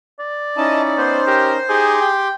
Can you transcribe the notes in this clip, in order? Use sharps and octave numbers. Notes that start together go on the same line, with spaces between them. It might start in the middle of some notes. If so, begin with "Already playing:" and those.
D5
C#4 D#4 E4 D#5 A5
B3 C5
G4 A#4
D#4 G4 G#4 C6 D6
G5